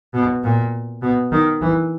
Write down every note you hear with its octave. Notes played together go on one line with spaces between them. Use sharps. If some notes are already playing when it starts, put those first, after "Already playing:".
B2
A#2
B2
D#3
E3